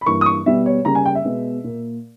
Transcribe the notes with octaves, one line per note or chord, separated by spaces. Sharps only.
B5
G2 E3 A#3 C#6
D#6
C#6
B2 G3 B3 E5
C#5
C#3 G3 A#3 A#5
G#5
G5
E5
B2 G#3 B3
A#2 A#3